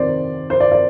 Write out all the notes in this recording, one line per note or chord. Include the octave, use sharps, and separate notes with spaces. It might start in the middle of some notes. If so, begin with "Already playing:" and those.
Already playing: F2 C3 D#3 C5 D5
C5
D5
D5